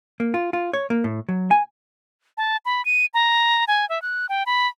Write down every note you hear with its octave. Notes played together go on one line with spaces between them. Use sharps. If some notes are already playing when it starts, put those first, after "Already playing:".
A#3
F4
F4
C#5
A#3
A2
F#3
G#5
A5
B5
D#7
A#5
G#5
E5
F#6
G5
B5